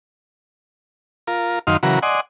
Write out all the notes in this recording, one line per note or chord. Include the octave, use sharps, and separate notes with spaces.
F4 A#4
F#2 D#3 D#4 F5 C6 F6
C#3 E3 F#3 F#4 A#4 B4
D5 D#5 F#5 G#5 C6